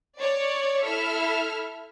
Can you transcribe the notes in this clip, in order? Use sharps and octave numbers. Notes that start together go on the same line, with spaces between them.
C#5 D5
E4 A4 E5 F6